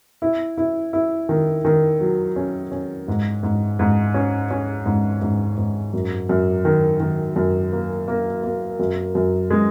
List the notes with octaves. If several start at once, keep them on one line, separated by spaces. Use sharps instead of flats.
E4
E4
E4
D#3
D#3
F#3
C#4
C#4
G#2
G#2
G#2
C#4
C#4
G#2
G#2
G#2
F#2
F#2
D#3
D#3
F#2
A#3
A#3
A#3
F#2
F#2
G#3